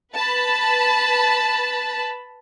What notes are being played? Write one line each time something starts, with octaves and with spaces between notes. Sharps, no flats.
B4 A5 B5